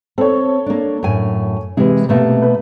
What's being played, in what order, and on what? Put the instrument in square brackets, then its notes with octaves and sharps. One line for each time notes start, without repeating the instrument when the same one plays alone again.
[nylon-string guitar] C4 [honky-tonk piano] A4 C#5
[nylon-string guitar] A#3 D4
F#2 A2 G#5
[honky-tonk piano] C3 [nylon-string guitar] E3 G#3
[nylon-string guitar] B2 A3 A#3
[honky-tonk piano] B4